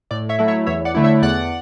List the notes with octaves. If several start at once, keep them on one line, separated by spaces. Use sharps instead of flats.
A2 D5
C#5 E5
F#3 A3 E4
C#5 E5
E2 C#5 E5
D5 F#5
D3 A3 E4
C#5 E5
E2 D5 F#5